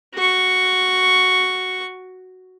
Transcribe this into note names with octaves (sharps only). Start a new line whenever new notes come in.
F#4 C#6